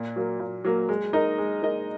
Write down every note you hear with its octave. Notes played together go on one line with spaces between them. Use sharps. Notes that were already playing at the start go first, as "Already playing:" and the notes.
Already playing: A#2
F#3 A#3
A#2
F#3 A#3
G#3
D#4 A#4 D#5
G#3
D#4 A#4 D#5